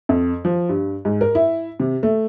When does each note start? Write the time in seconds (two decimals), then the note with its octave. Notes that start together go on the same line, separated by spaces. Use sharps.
0.09 F2
0.45 F3
0.69 G2
1.05 G#2
1.21 A#4
1.35 E4
1.80 C3
2.03 A3